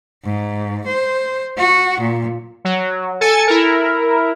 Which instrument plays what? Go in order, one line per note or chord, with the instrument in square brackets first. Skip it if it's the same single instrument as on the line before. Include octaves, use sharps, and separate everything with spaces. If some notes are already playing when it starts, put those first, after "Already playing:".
[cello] G#2
C5
F#4
A#2
[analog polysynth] F#3
A4 G#5 A6 C#7
E4 A#4